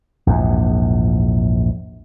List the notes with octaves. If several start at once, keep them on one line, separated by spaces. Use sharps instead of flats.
A#1 E2 G#2